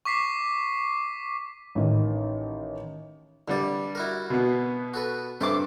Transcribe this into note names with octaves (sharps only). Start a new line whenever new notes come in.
C#6 D6 B6 C7
A1 D#3
G2 D3 G3 D5
E4 F#4 A#4
B2 B3
F#4 A4 B4
G2 A4 C5 E5 D6